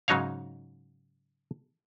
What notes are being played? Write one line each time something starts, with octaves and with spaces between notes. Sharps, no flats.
G#2 C#3 F#3 D#4 C#5 F5